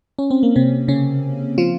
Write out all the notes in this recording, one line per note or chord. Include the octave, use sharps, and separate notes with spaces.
C#4
C4
A#3
C3 C4
C#3 C#4
F3 F4